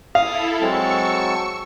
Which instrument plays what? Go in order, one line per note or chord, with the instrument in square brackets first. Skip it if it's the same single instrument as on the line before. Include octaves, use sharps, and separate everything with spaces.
[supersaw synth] E4 A4 [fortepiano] F5 [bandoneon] D#6
[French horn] F#3 [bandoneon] G#3 C4 A5 [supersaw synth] C#6 E6 C#7